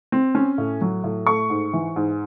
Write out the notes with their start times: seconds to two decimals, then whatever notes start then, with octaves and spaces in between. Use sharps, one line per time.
0.12 C4
0.35 C#4
0.58 A2
0.81 F#3
1.04 A2
1.27 A3 C#6
1.50 G#2
1.73 E3
1.96 G#2